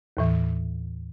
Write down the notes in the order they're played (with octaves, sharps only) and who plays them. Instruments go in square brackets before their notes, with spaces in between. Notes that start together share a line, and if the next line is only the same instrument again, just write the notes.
[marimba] D#2 A2 E3